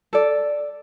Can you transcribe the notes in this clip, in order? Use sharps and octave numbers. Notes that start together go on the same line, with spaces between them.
A4 D5